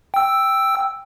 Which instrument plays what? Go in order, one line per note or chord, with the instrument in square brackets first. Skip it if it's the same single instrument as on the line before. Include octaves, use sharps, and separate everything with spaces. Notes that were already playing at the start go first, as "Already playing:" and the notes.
[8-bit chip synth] G5 E6